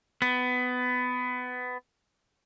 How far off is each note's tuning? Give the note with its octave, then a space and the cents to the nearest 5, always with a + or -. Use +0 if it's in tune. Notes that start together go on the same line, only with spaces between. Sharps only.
B3 +20